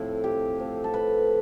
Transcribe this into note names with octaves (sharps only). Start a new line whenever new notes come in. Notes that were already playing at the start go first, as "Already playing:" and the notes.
Already playing: A2 F3 C4 E4
G4
A2 F3 C4
A4
B4